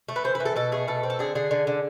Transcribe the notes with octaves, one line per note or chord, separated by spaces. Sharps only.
A3
B4
E3 C5
B4
E3
A4
B2 A4
A3 G#4
B2 A4
C4
A4
D3 G#4
D3 G#4
D3
D3